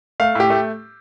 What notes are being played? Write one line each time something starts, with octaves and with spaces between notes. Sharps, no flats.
A3 F5
A2 G4
A3